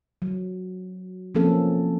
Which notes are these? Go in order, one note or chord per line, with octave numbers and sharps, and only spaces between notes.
F#3
F3 A#3 C4 C#4 A4